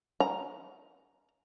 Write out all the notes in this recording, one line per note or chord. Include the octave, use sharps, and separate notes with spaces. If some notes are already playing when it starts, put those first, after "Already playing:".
A#5